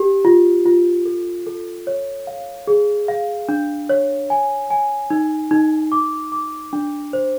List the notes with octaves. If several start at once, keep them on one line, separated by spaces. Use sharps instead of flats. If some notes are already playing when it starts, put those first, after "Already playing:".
Already playing: G4
F4
F4
A4
A4
C#5
F5
G#4
F5
D4
C#5
G#5
G#5
D#4
D#4
D6
D6
D4
C5